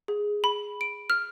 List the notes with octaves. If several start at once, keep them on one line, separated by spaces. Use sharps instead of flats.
G#4
B5
D7
F6